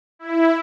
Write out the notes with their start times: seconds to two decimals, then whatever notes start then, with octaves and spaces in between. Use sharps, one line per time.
0.19 E4